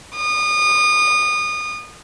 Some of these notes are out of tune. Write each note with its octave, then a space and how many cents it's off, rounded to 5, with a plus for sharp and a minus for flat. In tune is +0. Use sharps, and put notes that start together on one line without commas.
D#6 -30